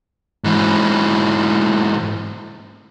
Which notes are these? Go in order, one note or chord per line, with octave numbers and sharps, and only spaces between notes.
G#2 E3